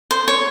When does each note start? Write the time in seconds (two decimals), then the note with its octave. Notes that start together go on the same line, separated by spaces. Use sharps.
0.11 C5
0.28 C#5